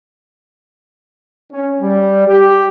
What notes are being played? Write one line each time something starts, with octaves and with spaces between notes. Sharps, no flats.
C#4
G3
G4